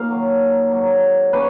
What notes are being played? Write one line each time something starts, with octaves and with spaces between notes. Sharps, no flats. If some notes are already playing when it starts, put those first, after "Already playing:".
Already playing: A#2 D#4 F5
D#3 F#3 A#3
G#2 F#3 A#3
D#3 A#3 C#4 B4